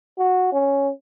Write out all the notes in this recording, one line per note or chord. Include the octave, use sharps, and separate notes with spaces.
F#4
C#4